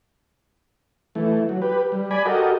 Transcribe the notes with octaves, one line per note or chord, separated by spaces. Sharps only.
E3 A3
F#3
G4 B4
G3
D5 G#5 B5
F#4 G4 A4 A#4 D#5